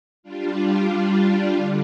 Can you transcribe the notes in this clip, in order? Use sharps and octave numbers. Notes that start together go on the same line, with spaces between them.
G3 D4 F4
D3